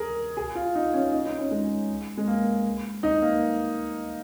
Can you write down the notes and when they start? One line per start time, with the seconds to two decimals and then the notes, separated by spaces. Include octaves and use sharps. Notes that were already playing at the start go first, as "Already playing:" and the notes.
Already playing: G#4 A#4
0.37 G#4
0.55 F4
0.75 D#4
0.94 C#4
1.13 D#4
1.25 D#4
1.38 C#4
1.51 G#3
2.17 G#3
2.27 A#3
3.03 D#4
3.22 A#3